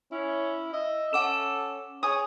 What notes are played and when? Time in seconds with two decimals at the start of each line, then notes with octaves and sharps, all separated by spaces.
0.12 C#4 E4
0.73 D#5 E5
1.13 C#4 A4 F#5 D6 E7
2.03 G#4 C#5 D#6